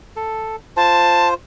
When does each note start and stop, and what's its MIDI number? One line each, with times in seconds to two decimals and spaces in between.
0.16 0.56 69
0.77 1.34 65
0.77 1.34 72
0.77 1.29 81